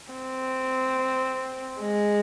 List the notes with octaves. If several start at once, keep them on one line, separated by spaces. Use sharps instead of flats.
C4
G#3